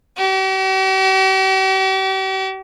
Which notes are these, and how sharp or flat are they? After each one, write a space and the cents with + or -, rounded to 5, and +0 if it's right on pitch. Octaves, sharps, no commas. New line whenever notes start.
G4 -45